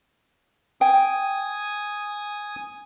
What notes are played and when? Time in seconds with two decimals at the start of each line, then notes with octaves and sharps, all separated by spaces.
0.81 G5 G#5 D#6